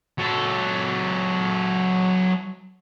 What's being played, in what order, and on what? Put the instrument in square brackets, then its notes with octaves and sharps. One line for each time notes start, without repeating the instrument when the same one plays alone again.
[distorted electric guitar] F#3 A4